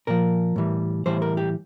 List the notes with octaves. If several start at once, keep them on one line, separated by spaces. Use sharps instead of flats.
A#2 F3 A#4
A2 E3 G3
A2 E3 G3 C5
A#4
G4